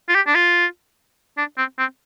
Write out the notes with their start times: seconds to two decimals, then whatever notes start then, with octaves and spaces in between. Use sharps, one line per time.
0.08 F4
0.14 G4
0.27 D4
0.35 F4
1.37 D4
1.58 C4
1.79 C4